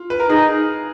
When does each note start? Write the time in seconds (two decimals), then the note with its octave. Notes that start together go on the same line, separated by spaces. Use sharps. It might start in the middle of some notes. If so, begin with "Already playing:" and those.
Already playing: F4
0.10 B4
0.20 A#4
0.29 D#4 G#4